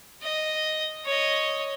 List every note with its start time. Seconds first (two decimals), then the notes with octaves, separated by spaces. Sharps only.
0.22 D#5
1.05 C#5 D#5